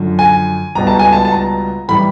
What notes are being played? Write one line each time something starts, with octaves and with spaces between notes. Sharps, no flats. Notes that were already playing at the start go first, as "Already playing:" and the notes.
Already playing: F#2 D3 F3
G#5
C#2 B2 G3 A#5
A5
G#5
A5
A5
A#5
A2 E3 G3 B5